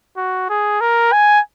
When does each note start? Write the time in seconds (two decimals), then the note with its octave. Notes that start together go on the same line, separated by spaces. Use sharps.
0.17 F#4
0.49 G#4
0.81 A#4
1.12 G#5